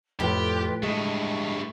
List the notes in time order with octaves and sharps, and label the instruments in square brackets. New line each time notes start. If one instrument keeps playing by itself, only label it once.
[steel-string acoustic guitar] F2 [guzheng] A2 [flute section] F4 B4 G5 [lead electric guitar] G4
[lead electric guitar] G2 A3 [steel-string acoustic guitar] G#3 [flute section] C#6